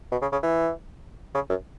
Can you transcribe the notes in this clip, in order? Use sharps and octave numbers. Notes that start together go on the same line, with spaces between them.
B2
C#3
C#3
E3
C#3
F#2